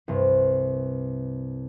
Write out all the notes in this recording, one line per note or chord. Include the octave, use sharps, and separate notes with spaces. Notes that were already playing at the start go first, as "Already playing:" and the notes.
C2 G2